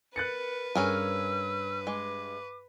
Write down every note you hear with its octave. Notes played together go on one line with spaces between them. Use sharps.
A#4 B4 F#6 A6 C#7
G2 C#4 G#4 A#4 E6
G#3 D6